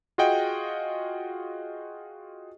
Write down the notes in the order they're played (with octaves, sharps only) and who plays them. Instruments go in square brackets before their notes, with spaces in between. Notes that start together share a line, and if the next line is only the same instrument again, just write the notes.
[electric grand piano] F4 F#4 G#4 D#5 F#5 G5